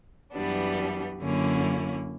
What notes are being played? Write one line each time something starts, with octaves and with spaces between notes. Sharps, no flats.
F#2 E3 G3 B3 D4
F#2 D3 A#3 C#4 E4